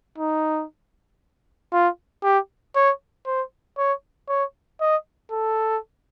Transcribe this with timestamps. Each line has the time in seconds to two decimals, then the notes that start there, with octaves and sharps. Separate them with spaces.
0.18 D#4
1.73 F4
2.23 G4
2.76 C#5
3.26 C5
3.78 C#5
4.29 C#5
4.81 D#5
5.31 A4